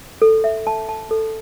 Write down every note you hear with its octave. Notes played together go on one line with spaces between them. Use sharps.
A4
E5
A5
A5
A4